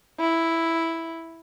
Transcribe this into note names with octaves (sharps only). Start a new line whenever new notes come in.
E4